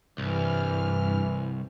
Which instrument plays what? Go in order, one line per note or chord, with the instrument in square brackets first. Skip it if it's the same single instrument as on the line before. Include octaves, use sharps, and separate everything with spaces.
[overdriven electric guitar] C2 [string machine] G2 F6 [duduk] E3